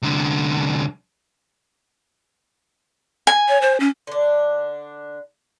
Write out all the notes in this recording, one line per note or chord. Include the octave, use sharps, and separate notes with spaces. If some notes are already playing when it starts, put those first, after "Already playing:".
C2 D3
G#5
C#5
C5
C#4
D3 D4